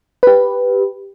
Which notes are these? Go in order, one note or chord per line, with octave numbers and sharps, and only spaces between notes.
G4 B4